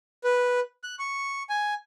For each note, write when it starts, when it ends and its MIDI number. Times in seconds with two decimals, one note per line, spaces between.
0.24 0.60 71
0.84 0.95 90
0.99 1.43 85
1.49 1.74 80